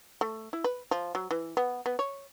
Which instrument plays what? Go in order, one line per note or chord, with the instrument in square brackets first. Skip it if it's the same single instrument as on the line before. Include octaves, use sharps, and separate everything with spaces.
[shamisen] A3
E4
B4
F3
F#3
E3
B3
B3
C#5